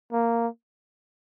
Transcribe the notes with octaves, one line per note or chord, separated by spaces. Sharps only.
A#3